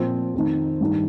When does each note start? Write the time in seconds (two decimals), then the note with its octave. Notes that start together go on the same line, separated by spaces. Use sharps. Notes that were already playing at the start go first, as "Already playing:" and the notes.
Already playing: A#2 F3 C4
0.34 F2 D#3
0.81 G2 D#3